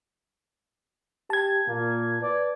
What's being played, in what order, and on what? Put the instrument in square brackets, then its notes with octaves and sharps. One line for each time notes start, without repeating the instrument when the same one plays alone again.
[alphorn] G4 [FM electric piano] A5 G#6
[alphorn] A#2 [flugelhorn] A#3
[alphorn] B4 [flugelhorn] D5